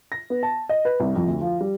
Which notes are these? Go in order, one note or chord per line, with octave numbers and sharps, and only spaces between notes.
A#6
B3
A5
D#5
B4
C2
F2
D2
F3
G3